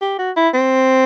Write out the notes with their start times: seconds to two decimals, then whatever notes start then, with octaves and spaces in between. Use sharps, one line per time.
0.02 G4
0.19 F#4
0.37 E4
0.54 C4